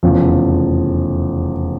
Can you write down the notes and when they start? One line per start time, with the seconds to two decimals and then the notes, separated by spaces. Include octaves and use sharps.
0.03 F1 E2 C#3 F3